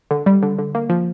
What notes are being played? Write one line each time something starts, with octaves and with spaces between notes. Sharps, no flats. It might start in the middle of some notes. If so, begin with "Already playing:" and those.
D3
G3
D3
D3
A#3
F3